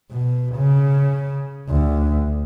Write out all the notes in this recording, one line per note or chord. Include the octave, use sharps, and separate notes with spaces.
B2
C#3
D2